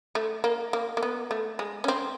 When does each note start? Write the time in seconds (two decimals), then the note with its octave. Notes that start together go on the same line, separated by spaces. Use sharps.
0.15 A3
0.44 A#3
0.73 A#3
0.97 A#3
1.03 B3
1.31 A3
1.59 G#3
1.84 C#4
1.88 C4